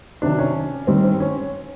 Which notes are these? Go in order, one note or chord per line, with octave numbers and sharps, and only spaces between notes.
C3 D#3 F#3 D4
C#4
G2 D#3 G3 C4
C4
C#4